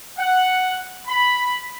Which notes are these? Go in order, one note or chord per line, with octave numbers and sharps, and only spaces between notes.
F#5
B5